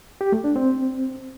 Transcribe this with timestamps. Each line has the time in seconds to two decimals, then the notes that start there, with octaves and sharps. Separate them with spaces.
0.21 G4
0.32 A3
0.44 D4
0.56 C4